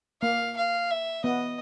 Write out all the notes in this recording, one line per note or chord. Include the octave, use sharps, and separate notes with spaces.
A#3 F5
F5
E5
B3 D#5